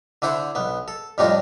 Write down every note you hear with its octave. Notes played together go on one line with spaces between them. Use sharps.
D3 D4 E4 C5 F#5
B1 B3
A4
F2 A2 G3 D4 D#4 F4